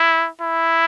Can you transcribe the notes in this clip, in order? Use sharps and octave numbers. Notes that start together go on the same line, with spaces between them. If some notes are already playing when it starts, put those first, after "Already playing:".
Already playing: E4
E4